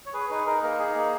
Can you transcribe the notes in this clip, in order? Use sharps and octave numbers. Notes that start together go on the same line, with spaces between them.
C#5
G#4 B4
D#4 B4
D#4 A#4
A#3 A#4
D#4 G#4
A#3